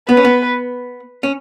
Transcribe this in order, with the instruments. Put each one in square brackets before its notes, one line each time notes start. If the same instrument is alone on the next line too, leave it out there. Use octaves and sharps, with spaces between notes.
[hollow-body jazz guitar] B3 [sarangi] B4
[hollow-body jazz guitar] C#4
B3
C#4